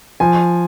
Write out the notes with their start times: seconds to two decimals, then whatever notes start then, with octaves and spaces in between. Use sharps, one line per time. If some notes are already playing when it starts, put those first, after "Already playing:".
0.20 F3 G#5